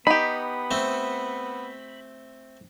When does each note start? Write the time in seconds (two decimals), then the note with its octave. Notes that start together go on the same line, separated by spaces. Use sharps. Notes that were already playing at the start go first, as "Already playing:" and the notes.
0.07 B3 D#4 G4 B5
0.71 A3 C4